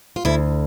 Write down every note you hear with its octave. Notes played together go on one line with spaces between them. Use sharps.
F4
D2 E4